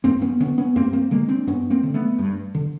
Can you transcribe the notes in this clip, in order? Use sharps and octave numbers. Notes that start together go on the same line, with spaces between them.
G2 A#3 C4
B3 C#4
D3 B3 C#4
B3 C#4
G2 A#3 C4
A#3 C4
D3 G#3 A#3
C4 D4
G2 B3 C#4
A#3 C4
D3
A3 B3
G2
D3